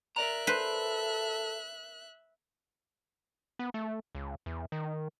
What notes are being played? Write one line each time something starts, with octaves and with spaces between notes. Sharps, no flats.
A#4 D5 E5 A#5 F#6
A4 B4 C5
B3
A3
C#2
E2
D#3